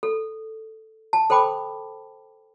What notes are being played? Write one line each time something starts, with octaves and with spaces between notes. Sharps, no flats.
A4
A5
A4 C5 G5 B5 D6